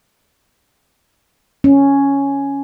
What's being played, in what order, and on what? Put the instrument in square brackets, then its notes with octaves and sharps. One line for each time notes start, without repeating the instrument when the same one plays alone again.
[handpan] C#4